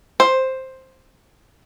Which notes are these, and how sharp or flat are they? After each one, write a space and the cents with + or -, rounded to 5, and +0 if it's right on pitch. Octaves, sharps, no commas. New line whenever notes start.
C5 +5